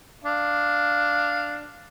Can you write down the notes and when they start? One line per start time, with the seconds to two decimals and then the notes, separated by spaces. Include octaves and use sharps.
0.24 D4 F5